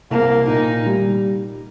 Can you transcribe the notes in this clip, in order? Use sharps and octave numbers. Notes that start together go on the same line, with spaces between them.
C2 A#3
A#2 D#4
G3